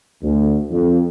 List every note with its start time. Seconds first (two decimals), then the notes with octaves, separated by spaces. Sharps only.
0.22 D2
0.71 F2